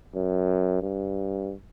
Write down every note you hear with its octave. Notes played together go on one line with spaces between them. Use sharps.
F#2
G2